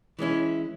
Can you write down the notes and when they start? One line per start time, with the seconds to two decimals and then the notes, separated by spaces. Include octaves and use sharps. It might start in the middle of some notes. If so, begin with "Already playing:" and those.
0.19 E3 G#3 C#4 E4